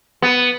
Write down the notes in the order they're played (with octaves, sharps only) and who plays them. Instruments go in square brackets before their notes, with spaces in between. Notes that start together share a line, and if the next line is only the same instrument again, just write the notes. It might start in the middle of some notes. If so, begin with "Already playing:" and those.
[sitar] B3